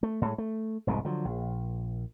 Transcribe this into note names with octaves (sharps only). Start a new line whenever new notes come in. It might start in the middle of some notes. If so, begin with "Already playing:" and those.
A3
A2 G#3
A3
F1 C2 G#2 B2
D3 F3 F#3
A#1